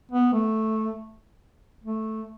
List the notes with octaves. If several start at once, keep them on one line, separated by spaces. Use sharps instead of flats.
B3
A3
A3